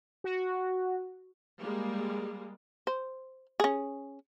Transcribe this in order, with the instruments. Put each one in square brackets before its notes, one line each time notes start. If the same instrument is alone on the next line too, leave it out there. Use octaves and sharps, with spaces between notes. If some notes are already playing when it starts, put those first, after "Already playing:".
[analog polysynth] F#4
[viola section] G3 G#3 A#3
[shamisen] C5
C#4 G#4